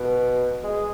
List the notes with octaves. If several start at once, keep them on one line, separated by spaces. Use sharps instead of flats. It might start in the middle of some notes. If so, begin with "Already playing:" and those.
Already playing: B2
G#3